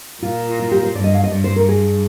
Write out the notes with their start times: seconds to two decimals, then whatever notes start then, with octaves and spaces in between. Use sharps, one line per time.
0.22 A#2 F4
0.59 F4
0.71 G4
0.83 C5
0.95 G2 D5
1.04 D#5
1.14 F5
1.24 D#5
1.32 G2 D5
1.44 C5
1.56 A#4
1.69 G#4